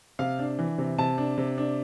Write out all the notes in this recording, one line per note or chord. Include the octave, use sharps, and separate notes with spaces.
C3 F5
D4
E3
C3
C3 A5
D4
C3
D4